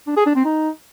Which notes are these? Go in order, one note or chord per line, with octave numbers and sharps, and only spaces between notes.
D4
G#4
D4
C4
D#4